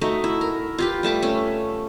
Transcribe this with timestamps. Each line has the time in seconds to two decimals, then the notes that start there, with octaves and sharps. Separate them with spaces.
0.01 A3 D#4 F#4
0.24 E4
0.41 A#4
0.78 F4 G4 B4
1.03 G3 A3 A5 D6
1.22 A3 C#4